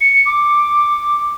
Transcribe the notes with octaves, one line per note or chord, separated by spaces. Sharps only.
C#7
D6